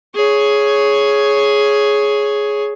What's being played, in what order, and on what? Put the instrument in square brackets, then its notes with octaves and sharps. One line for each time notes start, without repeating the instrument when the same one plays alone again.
[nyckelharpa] G#4 C#5